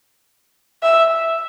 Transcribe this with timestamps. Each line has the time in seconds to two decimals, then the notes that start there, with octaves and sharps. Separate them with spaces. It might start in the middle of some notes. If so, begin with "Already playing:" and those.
0.83 E5